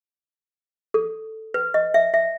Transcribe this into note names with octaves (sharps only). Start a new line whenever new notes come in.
A4
B4
D#5
E5
E5